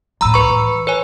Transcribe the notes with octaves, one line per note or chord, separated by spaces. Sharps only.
C#2 A2 A#5 B5 E6
B4 C#6
E3
B4 C#5 G#5